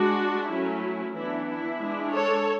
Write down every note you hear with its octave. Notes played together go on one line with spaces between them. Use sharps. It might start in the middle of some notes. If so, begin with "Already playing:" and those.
Already playing: G#3 D4 F#4
F#3 A3 C#4 E4
E3 B3 D4 E4
E4
G#3 D4
A4 C#5